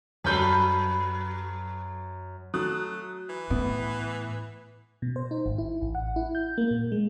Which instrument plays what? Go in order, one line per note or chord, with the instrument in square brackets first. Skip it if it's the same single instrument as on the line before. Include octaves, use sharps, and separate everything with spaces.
[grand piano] F#2 G6 [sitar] F#3 A4 B4
[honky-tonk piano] F#3 D#6 F#6 [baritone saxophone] A3
[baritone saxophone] E3
[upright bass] A2 [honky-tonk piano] B3
[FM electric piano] B2
C5
D#4
G#1
E4
A1
F#5
E4
G6
A#3
A#2
G#3